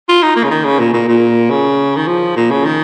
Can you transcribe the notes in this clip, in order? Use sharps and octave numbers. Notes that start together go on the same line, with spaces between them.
F4
D#4
A#3
C#3
D#3
C#3
A#2
A#2
A#2
C#3
D#3
F3
A#2
C#3
D#3